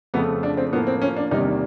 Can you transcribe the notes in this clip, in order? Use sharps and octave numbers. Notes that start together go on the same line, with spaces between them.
F2 C#3 F3 A3 B3
D4
C4
A2 F3 A#3 B3
C4
C#4
D4
E2 C3 D#3 G3 A#3 D#4